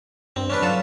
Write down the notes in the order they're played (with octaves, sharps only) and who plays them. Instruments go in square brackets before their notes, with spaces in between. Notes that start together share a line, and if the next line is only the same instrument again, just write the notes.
[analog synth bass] G2 [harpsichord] C4
[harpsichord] C#4 D4 B4
[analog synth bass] F#3 [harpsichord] F4 A4